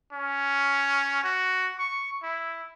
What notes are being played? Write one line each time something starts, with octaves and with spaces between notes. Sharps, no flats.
C#4
F#4
C#6
E4